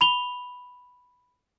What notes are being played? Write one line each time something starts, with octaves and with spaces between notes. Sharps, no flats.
B5 F7 G7